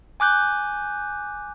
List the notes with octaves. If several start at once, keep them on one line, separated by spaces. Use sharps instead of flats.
G#5 D6 F#6 G6